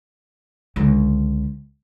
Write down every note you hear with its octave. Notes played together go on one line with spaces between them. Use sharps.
C#2 D3